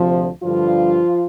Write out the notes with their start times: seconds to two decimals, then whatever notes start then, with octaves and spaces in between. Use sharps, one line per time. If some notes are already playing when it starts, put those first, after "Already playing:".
Already playing: D2 C3 F3
0.42 G2 D3 F3 G3 F4